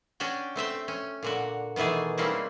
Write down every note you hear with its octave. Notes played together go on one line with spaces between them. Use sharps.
C#4 D4 F#4 G5
A3 C4 E5 G5
C#4
A#2 D3 F#4
B2 D#3 E3 A3 G#4
G3 G#3 A#3 C4 C#4 E4